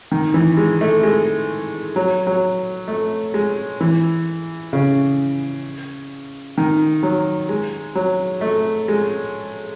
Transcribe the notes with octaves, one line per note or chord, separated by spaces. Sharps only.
D#3
E3
G#3
A3
G#3
F#3
F#3
A3
G#3
E3
C#3
D#3
F#3
G#3
F#3
A3
G#3